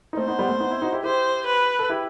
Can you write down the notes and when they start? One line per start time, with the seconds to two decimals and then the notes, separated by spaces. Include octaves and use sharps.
0.13 D#4
0.17 A3 C4 C5
0.28 B3 D#4
0.39 G3 B3
0.49 A3 C4
0.60 B3 D#4
0.71 C4 E4
0.82 D#4 F#4
0.93 E4 G4
1.03 E4 G4 C5
1.47 B4
1.79 A4
1.89 E4 G4